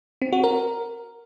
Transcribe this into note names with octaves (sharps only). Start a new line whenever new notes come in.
C4
F#4
A#4